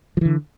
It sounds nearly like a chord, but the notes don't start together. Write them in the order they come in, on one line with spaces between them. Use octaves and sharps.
F3 E3 D3